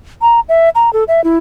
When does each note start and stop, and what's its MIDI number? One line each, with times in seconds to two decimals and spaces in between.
0.22 0.40 82
0.49 0.69 76
0.75 0.92 82
0.93 1.04 69
1.08 1.23 76
1.24 1.38 64